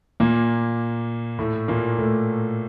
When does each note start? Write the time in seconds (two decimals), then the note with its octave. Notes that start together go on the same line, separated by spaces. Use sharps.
0.20 A#2 A#3
1.39 A2 A3
1.68 A#2 A#3
1.98 A2 A3